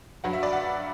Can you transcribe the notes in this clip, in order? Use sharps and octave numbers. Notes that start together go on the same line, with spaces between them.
G2 F#3 F#5
E5
D5
F#5